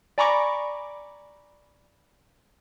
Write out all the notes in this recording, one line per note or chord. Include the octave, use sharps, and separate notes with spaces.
D5 G#5 A#5 B5 C#6 D6